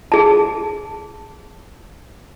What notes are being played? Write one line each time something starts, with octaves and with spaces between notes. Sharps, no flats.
G#4 A5